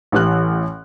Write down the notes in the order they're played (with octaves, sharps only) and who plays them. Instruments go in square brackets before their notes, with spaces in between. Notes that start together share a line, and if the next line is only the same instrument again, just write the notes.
[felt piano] A1 E3 G4 F6 F#6